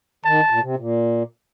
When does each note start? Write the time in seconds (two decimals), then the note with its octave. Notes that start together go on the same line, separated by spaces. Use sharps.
0.25 D#3 A5
0.50 A#2
0.60 C3
0.76 A#2